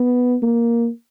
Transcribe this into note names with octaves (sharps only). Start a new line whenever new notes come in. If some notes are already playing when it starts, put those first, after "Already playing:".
Already playing: B3
A#3